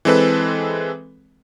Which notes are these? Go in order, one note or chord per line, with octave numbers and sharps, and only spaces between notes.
E3 G#3 C4 A4 B4